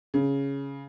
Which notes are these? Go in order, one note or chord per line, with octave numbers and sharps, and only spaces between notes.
C#3